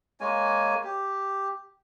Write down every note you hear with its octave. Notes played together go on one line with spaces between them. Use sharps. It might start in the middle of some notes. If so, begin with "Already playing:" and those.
G#3 A#3 C#5 G#5
G4